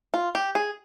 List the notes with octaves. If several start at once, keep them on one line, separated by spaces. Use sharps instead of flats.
F4
G4
G#4